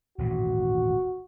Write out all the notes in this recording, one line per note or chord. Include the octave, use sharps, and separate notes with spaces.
D#1 A1 G#2 F#4